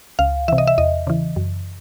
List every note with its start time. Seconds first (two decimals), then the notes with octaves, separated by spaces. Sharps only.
0.19 C#2 F5
0.48 C3 E3 E5
0.58 D#5
0.67 E5
0.78 E2 D#5
1.07 C#3 E3
1.36 F#2